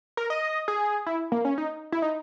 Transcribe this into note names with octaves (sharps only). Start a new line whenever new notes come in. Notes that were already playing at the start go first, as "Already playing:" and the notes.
A#4
D#5
G#4
E4
A#3
C#4
D#4
E4
D#4